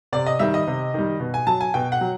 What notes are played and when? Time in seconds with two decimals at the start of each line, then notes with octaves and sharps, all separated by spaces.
0.13 C3 D5
0.26 D#5
0.39 D#3 G3 E5
0.54 D#5
0.67 C3
0.94 D#3 G3
1.20 B2
1.34 G#5
1.47 F#3 A5
1.61 G#5
1.74 B2 G5
1.92 F#5
2.01 F#3